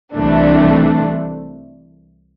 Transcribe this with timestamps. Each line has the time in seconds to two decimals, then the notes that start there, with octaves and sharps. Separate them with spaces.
0.15 C2 C3 E3 A3 D4